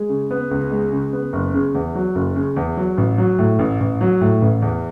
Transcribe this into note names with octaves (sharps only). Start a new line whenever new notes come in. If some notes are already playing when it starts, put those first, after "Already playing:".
Already playing: G#3
C#3
B3
C#2
G#3
C#3
B3
F#1
C#3
E2
F#3
F#1
C#3
E2
F#3
A1
F#3
A2
A1
A1
F#3
A2
A1
E2